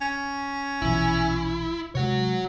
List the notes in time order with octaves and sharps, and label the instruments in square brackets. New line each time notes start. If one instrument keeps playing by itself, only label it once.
[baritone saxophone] C#4
[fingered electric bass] A#1 B2 E3 [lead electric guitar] E4
[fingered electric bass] C3 G#3 [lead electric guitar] F#4 C#5